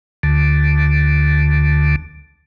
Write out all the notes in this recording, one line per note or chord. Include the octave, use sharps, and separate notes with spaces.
D2 D3